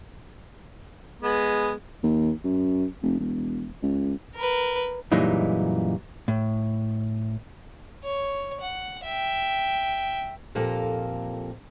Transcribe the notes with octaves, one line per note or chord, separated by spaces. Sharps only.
G#3 B3
D#2
F#2
F1
E1
C#2
A#4 B4
F#2 A#2 E3 G3 G#3 D#4
A2
C#5
F#5
E5 G5
F2 A#2 A#3 G4 A4